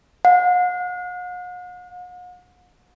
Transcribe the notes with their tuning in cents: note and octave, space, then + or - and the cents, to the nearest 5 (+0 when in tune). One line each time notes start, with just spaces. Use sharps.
F#5 -45